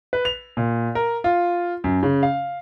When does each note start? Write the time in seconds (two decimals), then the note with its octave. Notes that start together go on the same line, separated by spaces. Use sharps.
0.13 B4
0.25 F7
0.57 A#2
0.95 A#4
1.24 F4
1.84 F#2
2.03 C#3
2.23 F5